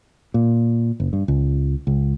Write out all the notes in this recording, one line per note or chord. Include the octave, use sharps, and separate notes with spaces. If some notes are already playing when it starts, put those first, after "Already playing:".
A#2
F#1
G2
C#2
C#2